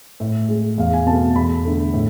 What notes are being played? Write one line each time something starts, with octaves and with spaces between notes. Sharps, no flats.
A2
G#3
E2 F5
G#5
B2 A3 A5
E2 B5
D3 A3
A2